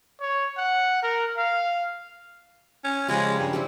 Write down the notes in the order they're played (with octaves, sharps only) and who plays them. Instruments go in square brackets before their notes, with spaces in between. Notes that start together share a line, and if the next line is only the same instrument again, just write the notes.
[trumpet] C#5
F#5
A#4
F5
[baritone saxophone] C#4
[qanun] C#3 F3 G3 [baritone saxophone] G#3
[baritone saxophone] G2
[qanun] G3 C4 E4